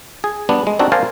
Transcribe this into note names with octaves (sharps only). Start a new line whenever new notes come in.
G#4
G3 B3 D4
G#3
C4 D4 D#4 F#4 A4
A#4 C5 D5 F5 G#5 A5